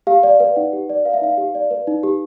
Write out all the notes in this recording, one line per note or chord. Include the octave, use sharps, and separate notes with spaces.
G4 F5
D5
B4
D#4 F#5
G4
D5
B4 F5
E5
D#4 F5
G4
D5
B4
D#4
G4